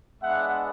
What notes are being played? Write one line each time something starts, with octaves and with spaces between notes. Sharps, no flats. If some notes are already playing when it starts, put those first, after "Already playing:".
G#3 B3 D4 E5 F#5